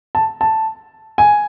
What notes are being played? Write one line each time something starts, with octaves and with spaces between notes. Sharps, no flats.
A5
A5
G#5